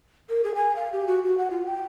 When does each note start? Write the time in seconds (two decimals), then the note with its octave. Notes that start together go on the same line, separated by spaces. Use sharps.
0.29 A#4
0.43 G#4
0.55 G#5
0.75 F5
0.92 G4
1.07 F#4
1.23 F#4
1.37 F#5
1.50 F4
1.66 G5